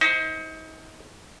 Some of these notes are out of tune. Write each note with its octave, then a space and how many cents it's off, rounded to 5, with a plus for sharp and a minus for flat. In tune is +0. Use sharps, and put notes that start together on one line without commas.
D#4 +35 C5 +0